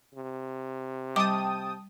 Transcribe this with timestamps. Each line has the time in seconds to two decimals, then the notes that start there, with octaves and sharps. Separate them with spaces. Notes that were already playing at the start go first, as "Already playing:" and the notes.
0.15 C3
1.16 G3 G5 A5 D6 D#6